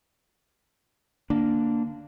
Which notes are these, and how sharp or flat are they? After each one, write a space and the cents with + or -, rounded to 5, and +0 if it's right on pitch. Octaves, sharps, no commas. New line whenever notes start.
D3 +0 A#3 -5 D4 +0